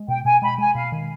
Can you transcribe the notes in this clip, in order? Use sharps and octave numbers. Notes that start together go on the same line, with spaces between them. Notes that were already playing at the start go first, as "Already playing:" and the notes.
Already playing: G#3
B2 G5
B2 G#5
G#3 B5
G#3 G#5
B2 F5
D#3